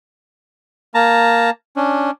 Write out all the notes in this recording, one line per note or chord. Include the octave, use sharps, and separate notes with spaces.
A#3 A5 A#5
C#4 D4